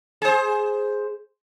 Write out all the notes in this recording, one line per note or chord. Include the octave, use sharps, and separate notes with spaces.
G#4 C5